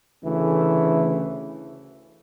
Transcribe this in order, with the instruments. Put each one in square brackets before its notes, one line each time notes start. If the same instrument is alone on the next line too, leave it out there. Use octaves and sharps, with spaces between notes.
[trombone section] D2 C#3 E3 A3